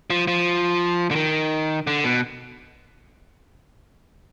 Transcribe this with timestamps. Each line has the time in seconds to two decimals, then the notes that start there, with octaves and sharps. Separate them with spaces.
0.10 F3
0.28 F3
1.11 D3
1.16 D#3
1.87 D3
2.04 B2